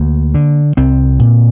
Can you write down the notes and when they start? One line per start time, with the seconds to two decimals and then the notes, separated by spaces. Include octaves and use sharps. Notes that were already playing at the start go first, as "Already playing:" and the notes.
Already playing: D2 A#3
0.34 D3
0.77 C2 C4
1.19 A#2